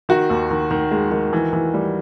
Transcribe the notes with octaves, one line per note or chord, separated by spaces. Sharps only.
D#3 F#4
D#2
D#3
D#3
G#3
D#3
E3
E3
G3